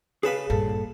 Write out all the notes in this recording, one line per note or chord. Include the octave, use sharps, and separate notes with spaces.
C#3 G#4 B4 F5 A5 B5
A#1 G2 A4